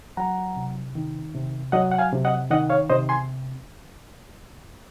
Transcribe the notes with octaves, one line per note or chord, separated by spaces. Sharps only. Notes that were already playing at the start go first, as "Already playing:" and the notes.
F#3 F#5 A#5
C3
D#3
C3
F#3 D#5 F#5
F#5
F5 G#5
C3
D#5 F#5
D#3 D#5 F#5
C#5 F5
C3 C5 D#5
G#5 C6